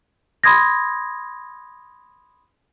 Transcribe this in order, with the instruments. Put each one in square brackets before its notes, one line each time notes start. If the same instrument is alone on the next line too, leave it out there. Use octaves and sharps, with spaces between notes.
[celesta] B5 C6 D#6 G#6 A#6